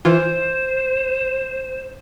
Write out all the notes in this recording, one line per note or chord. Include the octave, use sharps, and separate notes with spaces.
E3 F4 C5